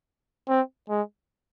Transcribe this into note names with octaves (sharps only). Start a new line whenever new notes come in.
C4
G#3